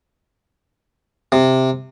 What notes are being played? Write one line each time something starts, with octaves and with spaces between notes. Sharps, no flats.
C3